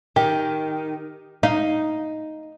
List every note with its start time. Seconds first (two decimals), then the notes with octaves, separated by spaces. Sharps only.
0.16 D#3 G4
1.43 D#4 F5